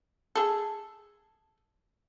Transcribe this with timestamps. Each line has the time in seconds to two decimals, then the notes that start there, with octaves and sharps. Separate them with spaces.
0.35 G#4 A4